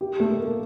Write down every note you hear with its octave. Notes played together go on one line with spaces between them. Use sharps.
G4
A3
A#3